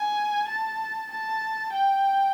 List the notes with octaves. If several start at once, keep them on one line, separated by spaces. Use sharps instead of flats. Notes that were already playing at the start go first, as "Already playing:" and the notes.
Already playing: G#5
A5
A5
G5